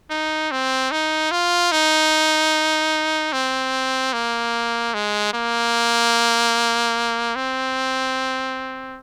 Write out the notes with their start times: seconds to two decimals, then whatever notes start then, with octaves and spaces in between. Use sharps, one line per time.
0.11 D#4
0.51 C4
0.92 D#4
1.31 F4
1.72 D#4
3.33 C4
4.13 A#3
4.94 G#3
5.34 A#3
7.36 C4